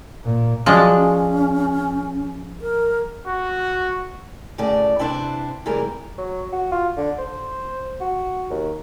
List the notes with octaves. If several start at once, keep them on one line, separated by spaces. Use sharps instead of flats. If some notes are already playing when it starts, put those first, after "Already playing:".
A#2
F3 F#3 G#3 D4
C#4
A#4
F#4
D2 A2 C#3 D5
C3 D4 E4 B4 C5
C3 E3 G3 G#3 A#4
F#3
F#4
F4
D3
C5
F#4
D#2